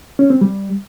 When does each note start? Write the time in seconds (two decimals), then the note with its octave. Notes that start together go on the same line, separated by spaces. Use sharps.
0.19 C#4
0.30 C4
0.41 G3